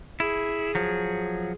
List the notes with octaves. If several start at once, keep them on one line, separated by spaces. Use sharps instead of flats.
E4 G#4
F3 F#3